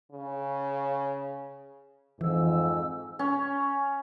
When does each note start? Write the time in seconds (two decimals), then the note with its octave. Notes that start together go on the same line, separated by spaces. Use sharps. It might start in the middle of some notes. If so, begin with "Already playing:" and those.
0.12 C#3
2.21 F2 G#2 E3 E6
3.19 C#4